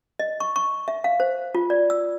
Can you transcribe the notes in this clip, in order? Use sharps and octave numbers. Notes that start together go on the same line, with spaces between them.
D#5
C#6
C#6
E5
F5
C5
F4
D5
E6